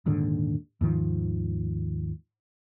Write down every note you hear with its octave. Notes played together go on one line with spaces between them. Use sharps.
D#1 D#2 G#2 D3
D#2 G#2 D#3 F3